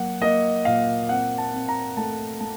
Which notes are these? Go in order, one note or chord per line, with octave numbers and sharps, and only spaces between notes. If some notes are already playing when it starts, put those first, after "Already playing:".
Already playing: F#3 A#3 F#5
A#3 D#5
A#2 F5
C4 F#5
A5
C4
A#5
A3 A5
A3 A5